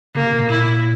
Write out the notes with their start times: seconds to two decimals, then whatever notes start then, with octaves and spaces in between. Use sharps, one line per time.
0.15 C#3 A#3
0.23 C3
0.32 B2
0.41 A#2
0.50 E4